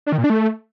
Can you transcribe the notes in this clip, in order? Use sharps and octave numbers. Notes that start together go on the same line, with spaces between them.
D4
D#3
A#2
D4
A3